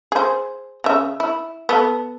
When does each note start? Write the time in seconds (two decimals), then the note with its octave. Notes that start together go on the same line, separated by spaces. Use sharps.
0.12 G#4 C5
0.84 C#3 E5
1.20 E4
1.69 B3 A4